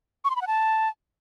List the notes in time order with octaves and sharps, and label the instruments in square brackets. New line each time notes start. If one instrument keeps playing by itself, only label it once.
[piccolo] C#6
C6
B5
F#5
A5